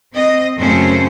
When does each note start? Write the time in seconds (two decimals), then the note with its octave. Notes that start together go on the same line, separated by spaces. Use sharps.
0.12 C4 D#5
0.58 F#2 C#3 A3 C4 C#4 C5